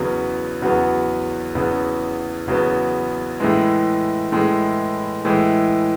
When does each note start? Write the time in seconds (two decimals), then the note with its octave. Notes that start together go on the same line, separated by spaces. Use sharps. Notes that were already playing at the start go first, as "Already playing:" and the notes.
Already playing: E2 C#3 F#3 B3
0.62 E2 C#3 F#3 B3
1.55 E2 C#3 F#3 B3
2.48 E2 C#3 F#3 B3
3.40 A2 E3 G#3
4.32 A2 E3 G#3
5.25 A2 E3 G#3